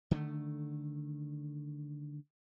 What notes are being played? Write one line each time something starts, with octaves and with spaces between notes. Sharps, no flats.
D3 D#3 G#3 A3